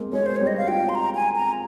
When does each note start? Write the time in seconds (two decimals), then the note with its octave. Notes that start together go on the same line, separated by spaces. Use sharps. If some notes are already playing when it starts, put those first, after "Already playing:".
Already playing: G#3 A#3 C4
0.13 G#3 C#5
0.26 C5
0.36 G3 C#5
0.47 D#5
0.57 F5
0.68 F4 G5
0.89 C6
0.95 A#5
1.15 G#5
1.36 A#5